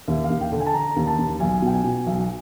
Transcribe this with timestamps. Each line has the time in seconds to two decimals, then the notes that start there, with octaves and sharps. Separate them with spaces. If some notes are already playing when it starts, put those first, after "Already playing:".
0.08 D#2 E5
0.24 F5
0.30 D#2
0.41 G5
0.52 D3
0.60 G#5
0.66 A5
0.74 D3 A#5
0.96 D#2
1.07 A5
1.18 D#2
1.40 B1 G#5
1.62 B2 G5
1.73 G#5
1.84 B2
2.06 B1